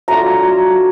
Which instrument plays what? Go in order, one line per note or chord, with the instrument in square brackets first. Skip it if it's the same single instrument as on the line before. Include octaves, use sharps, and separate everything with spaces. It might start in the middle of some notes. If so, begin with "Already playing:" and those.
[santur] F#3 A3 D4 F4 A#5